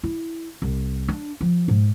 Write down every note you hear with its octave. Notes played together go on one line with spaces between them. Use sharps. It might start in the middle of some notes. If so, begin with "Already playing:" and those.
E4
C2
D4
F3
G#2